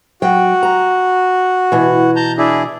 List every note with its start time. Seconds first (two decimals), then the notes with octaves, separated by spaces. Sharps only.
0.22 F#3 F#4 G5
0.63 A#5
1.72 B2 E3
2.16 A5 A#5 G6
2.38 D4 E4 G#4